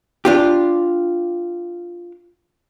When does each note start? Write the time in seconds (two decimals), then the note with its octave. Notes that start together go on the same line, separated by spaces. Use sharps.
0.25 D4 F4 G4